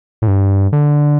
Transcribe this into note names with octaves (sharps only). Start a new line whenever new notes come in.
A2
G2
D3